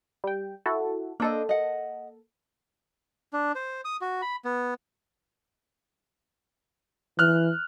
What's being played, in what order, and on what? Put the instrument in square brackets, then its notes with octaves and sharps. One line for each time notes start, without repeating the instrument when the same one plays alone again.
[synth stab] G3 G5
E4 F#4 A4
[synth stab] A#3 A4 [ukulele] D4 C5 D#5
[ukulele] D#5 F#5
[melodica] D4
C5
D#6
F#4
B5
B3
[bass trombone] E3 [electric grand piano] F6 F#6